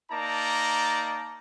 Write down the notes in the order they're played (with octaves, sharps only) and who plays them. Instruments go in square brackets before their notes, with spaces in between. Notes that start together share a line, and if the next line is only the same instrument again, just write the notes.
[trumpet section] A#3 D#4 D5 A5 A#5